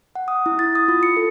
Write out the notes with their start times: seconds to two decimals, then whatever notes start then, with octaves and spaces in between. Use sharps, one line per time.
0.15 F#5
0.28 D#6
0.46 E4
0.59 A6
0.75 D#6
0.88 F4
1.03 C#7
1.17 A4